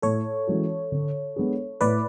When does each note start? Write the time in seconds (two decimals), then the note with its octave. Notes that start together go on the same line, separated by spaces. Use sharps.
0.02 A2 A4 C#5
0.47 E3 G#3 C#4 F#4
0.92 D3
1.36 G#3 B3 D4 G#4
1.81 A2 B4 D5